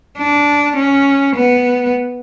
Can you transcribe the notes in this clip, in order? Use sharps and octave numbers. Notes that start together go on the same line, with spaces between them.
D4
C#4
B3